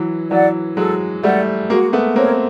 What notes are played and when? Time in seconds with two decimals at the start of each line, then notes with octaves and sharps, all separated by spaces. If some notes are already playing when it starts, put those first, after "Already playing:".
Already playing: E3 F#3
0.31 E3 F#3 D5 F#5
0.77 F#3 G#3 A4
1.23 G3 A3 D5 F#5
1.70 G#3 A#3 F#4
1.93 A3 B3
2.16 A#3 C4 A#4 C#5